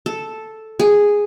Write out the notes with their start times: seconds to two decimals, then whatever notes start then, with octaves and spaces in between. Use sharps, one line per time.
0.06 A4
0.80 G#4